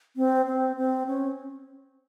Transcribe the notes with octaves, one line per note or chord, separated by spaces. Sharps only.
C4
C4
C4
C#4